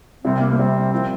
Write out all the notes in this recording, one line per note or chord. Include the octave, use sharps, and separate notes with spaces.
C2 C3 G3 C4
A#3
A#3
C2 C3 G3 C4
F3 A#3 C4 E4